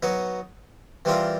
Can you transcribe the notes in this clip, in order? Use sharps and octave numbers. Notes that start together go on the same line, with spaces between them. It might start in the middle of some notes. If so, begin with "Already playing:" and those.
F#3 B3 D#4
E3 G3 C4 F4 A#4